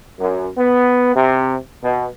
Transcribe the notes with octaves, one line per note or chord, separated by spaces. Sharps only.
F#2
B3
C3
B2